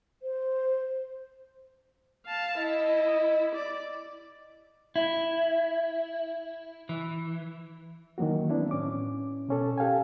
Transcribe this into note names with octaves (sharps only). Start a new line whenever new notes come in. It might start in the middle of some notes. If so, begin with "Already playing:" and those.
C5
F5 A5
E4 D#5
D5
E4
E3
D#3 E3 F#3 A#3 F#4
B3 C4 D4 E4
A2 C#4 D6
B2 C#4 A4
G4 A4 F5 G5 G#5